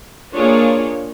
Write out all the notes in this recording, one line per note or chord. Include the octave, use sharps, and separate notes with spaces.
A#3 D4 F4 G#4 C#5